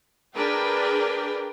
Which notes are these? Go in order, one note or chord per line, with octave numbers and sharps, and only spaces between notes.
D4 G#4 A#4 B4 G5